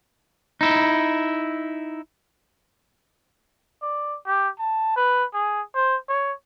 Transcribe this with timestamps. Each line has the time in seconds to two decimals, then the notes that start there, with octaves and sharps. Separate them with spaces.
0.61 D#4 E4
3.82 D5
4.26 G4
4.59 A5
4.96 B4
5.34 G#4
5.75 C5
6.09 C#5